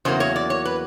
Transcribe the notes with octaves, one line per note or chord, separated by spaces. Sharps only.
E2 C#3 F#3 A#3 C5
C#5
D5
C#5
B4